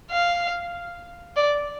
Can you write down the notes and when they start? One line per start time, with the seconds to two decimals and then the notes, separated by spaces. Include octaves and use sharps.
0.11 F5
1.36 D5